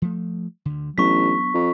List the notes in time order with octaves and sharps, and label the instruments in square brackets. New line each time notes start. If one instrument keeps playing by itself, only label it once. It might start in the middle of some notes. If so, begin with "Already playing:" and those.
[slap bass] F3 A3
D2 D3
[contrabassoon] A1 [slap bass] F#3 B3 D4 [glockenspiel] C#6 B6
[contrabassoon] F2